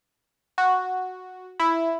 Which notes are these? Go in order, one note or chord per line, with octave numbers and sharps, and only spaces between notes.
F#4
E4